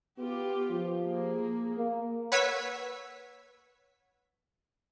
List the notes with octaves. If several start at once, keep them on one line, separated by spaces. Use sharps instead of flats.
B3 F4 G4
F3
A#3 G#4
A#3
B4 C#5 F#5 E6 G#6 B6